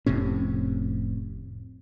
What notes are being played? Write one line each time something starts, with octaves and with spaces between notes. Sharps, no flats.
F1 A2 C3 C#4